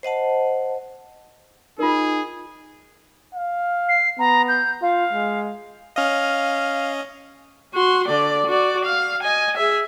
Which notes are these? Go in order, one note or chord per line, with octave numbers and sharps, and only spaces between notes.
C5 D#5 F#5 A5
D#4 F4 G#4 A#4
F5
C7
B3 A#5
G6
F4 F5
G#3
C#4 D#5 F5
F#4 C6
D3 D5
F#4 D5
F5
D#5 G#5
G#4 E5